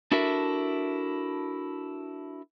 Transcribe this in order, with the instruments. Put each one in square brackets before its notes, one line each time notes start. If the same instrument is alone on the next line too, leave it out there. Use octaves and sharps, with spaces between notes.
[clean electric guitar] D4 E4 F#4 A4 A#4 E5